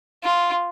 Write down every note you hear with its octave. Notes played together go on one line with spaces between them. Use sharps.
F4